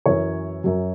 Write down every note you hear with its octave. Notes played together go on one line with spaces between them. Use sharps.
F#2 E3 C#5
F#2 F#3